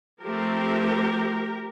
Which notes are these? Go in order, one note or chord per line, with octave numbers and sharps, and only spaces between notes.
F3 A3 C4 G4 A#4